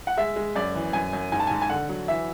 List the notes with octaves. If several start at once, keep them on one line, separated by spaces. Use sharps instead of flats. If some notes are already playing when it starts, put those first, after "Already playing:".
F#5
G#3 E5
G#3
F#2 D5
E3
F#2 G#5
F#2
G#2 G#5
A5
G#2 G#5
G#5
D3 F#5
F#3
E3 E5